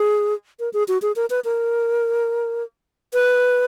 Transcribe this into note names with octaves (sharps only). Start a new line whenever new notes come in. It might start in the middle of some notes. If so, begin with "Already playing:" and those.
Already playing: G#4
A#4
G#4
F#4
G#4
A#4
B4
A#4
B4